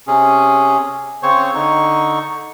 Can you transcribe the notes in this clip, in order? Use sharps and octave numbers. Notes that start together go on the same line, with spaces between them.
C3 C#4 G#4
C#3 C4 C5 C#5 C#6
D3 D#4 C#6